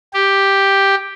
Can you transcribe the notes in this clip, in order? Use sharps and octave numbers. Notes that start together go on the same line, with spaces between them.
G4